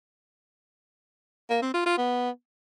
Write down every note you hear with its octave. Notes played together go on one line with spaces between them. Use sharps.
A#3
C4
F4
F4
B3